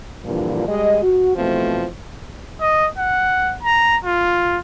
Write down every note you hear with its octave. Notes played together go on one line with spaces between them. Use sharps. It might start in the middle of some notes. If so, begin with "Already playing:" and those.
G2 A#2 D3 E3 F3
G3 G#3 D#5
F#4
B2 E3 F3 A3 C4
D#5
F#5
A#5
F4